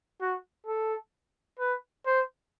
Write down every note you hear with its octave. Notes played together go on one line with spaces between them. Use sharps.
F#4
A4
B4
C5